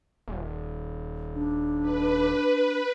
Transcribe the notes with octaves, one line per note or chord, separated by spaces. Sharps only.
D#1
D4
B4